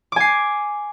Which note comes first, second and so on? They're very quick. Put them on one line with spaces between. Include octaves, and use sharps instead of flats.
D6 G#5 C7